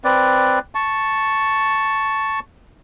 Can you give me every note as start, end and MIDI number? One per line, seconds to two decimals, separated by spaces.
0.04 0.59 60
0.04 0.59 71
0.04 0.59 74
0.75 2.40 81
0.75 2.40 85